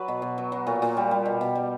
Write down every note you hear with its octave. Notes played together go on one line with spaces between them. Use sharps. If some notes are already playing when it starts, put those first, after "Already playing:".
Already playing: F#3 B4 D5
B2
B2
F#3
F#3
A#2
A#2
G3
G3
B2
B2
G3